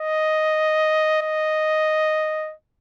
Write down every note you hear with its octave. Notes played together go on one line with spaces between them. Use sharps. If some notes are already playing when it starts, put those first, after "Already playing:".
Already playing: D#5
D#5